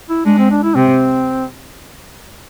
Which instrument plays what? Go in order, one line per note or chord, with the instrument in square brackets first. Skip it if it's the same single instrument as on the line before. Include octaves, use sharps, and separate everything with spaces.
[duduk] E4
[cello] G#3 [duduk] D4
[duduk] C4
D4
E4
[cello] C3 [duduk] C4